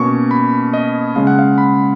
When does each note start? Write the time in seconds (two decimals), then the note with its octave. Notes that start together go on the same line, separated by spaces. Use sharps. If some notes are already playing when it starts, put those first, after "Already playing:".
Already playing: B2 A#3 C#4 C#6
0.31 B5
0.74 D#5
1.16 C#3 G#3 C#4 F5
1.27 F#5
1.39 F5
1.58 B5